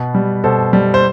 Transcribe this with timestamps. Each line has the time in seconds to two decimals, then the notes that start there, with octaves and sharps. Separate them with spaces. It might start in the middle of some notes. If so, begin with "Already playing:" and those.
Already playing: B2 B4
0.14 G3
0.44 B2 A4 C5
0.73 G3
0.94 C5